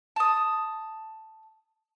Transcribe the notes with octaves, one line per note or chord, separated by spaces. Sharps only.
A5 D#6